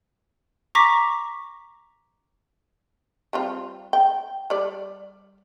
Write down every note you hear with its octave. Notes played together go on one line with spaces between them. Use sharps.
A#5 C#6 D6 A#6 B6
G3 C4 F4
G5
G3 D5